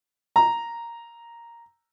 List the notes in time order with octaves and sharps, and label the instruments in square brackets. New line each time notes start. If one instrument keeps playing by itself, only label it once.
[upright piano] A#5